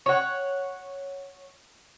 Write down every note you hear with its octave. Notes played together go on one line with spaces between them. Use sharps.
C#5 F#5